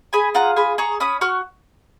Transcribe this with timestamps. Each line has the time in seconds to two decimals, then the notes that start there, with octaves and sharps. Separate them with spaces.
0.13 G#4 G#5 B5
0.35 F4 F#5 A#5
0.56 G#4 G#5 B5
0.78 G#4 A#5 C#6
1.00 C#4 B5 D#6
1.21 F#4 C#6 F6